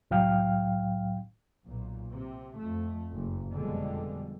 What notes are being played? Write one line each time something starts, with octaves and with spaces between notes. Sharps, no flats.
C2 A2 F#3 F5 G5 F6
B1 A#2
C3
F2 A3
F#1
F2 B2 D3 G3 G#3